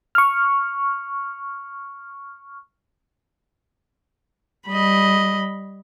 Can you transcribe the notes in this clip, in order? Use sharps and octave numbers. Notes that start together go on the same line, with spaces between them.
C#6 F6
G3 D#5 B5